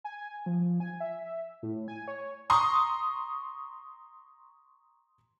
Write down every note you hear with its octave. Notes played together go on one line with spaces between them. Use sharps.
G#5
F3
G#5
E5
A2
G#5
C#5
A#5 C6 C#6 D#6